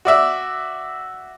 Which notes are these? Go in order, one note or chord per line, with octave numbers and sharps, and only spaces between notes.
F#4 D5 E5